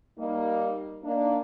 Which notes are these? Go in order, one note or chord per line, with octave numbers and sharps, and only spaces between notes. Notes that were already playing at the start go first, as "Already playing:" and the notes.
G3 A#3 D#4
A#3 D4 D#4